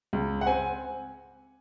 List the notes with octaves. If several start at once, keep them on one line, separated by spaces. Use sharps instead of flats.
C#2
F#5
C4 G#5